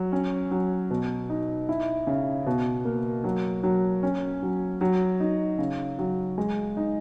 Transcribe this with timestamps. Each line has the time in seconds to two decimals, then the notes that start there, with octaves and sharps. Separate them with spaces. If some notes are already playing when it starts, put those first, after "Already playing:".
Already playing: F#3
0.12 C#4
0.51 F#3
0.90 B2
1.30 D#4
1.69 E4
2.07 C#3
2.46 B2
2.85 A#3
3.24 F#3
3.63 F#3
4.03 C#4
4.42 F#3
4.81 F#3
5.20 D#4
5.58 C#3
5.99 F#3
6.38 G#3
6.77 D#4